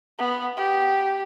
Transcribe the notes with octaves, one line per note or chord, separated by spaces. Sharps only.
B3
G4